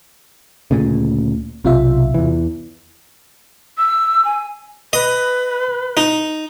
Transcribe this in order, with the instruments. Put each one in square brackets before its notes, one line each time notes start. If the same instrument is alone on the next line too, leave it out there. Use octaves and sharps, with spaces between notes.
[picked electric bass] D2 A#2 C#3
[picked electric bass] B1 [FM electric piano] C3 F4 E5
[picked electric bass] E2 E3
[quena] E6
G#5
[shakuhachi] B4 [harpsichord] D#5
[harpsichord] D#4